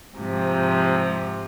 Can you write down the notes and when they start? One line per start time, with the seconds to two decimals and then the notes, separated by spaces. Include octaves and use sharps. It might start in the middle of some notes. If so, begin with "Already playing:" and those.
0.17 G#2 C3 F3